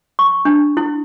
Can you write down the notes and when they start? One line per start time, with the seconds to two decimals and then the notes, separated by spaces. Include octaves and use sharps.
0.19 C#6
0.45 D4
0.77 E4